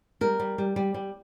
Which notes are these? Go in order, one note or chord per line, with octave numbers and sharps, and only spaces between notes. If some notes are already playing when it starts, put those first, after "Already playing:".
G3 A#4
G3
G3
G3
G3